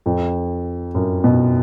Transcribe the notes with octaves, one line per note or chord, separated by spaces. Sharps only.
F2
F#2
B2